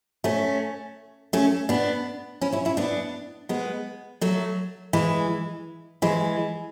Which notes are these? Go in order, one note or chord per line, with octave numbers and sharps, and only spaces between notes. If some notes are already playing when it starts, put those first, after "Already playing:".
A3 C#4
A3 C#4
B3 D4
C#4 E4
C#4 E4
C#4 E4
B3 D4
G#3 B3
F#3 A3
E3 G#3
E3 G#3